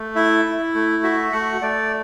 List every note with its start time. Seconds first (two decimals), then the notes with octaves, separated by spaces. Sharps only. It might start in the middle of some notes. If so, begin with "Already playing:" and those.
Already playing: A3
0.16 E4 E5
0.45 E4
0.74 A3
1.03 F#4 E5
1.32 A3 F#5
1.61 A3 D5